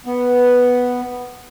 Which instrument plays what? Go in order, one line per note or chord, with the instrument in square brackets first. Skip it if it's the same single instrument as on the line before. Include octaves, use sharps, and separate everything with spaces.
[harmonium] B3